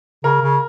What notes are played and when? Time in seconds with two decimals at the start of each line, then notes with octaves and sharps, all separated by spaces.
0.24 C#3 A#4
0.42 C#3